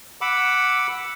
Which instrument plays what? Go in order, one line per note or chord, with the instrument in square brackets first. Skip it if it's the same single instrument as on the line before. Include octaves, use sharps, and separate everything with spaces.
[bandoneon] F#5 B5 D6 E6